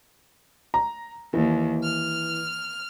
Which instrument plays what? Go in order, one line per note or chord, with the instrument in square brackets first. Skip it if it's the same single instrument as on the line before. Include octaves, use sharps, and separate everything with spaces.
[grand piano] A#5
[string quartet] D#2 [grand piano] E3
[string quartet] F6